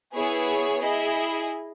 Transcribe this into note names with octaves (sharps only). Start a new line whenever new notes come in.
B3 E4 G#4 C#5
E4 G#4 D#5